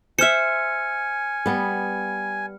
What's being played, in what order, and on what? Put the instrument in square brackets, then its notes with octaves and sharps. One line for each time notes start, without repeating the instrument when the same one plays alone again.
[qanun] C5 E5 [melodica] G#5 [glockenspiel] F6 C#7
[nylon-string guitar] G3 B3